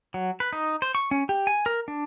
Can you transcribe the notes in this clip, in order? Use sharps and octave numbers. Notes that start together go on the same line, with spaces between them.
F#3
B4
D#4
C5
C#6
C#4
G4
G#5
A#4
D4